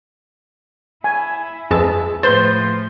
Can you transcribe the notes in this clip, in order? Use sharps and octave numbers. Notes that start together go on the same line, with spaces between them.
E4 G#5
F2 G#3 G#4 B4 A5 E6
A2 F3 B4 C5 C6 G6 A6